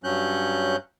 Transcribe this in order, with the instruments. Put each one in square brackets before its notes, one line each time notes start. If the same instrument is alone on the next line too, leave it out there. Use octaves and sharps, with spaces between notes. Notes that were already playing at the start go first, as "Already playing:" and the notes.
[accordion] G2 F#3 C#4 F#6 G6